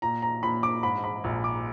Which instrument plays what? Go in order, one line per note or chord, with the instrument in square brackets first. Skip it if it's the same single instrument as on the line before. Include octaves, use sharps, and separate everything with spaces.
[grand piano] A#2 [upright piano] A#5
[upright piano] A#5
[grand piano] A#2 [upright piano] B5
[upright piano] D6
[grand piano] G#2 [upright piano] B5
[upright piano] B5
[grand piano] A#1
[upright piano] D6